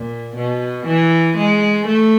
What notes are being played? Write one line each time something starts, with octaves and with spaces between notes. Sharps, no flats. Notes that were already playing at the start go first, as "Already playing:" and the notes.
Already playing: A#2
B2
E3
G#3
A3